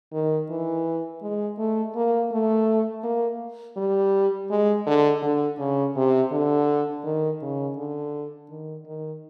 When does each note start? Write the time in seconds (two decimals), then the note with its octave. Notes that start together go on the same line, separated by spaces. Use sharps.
0.13 D#3
0.50 E3
1.22 G#3
1.58 A3
1.96 A#3
2.32 A3
3.04 A#3
3.77 G3
4.51 G#3
4.87 D3
5.22 D3
5.59 C#3
5.96 C3
6.32 D3
7.05 D#3
7.42 C#3
7.77 D3
8.50 D#3
8.87 D#3